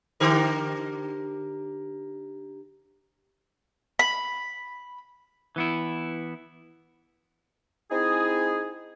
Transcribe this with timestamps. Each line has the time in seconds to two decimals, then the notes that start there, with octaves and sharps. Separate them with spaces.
0.20 D3 G4 A#4
3.99 B5
5.56 E3 B3 E4
7.90 C4 D#4 E4 G#4